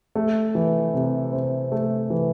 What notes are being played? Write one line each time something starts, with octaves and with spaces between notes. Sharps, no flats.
A3
E3
C3
C4
A3
E3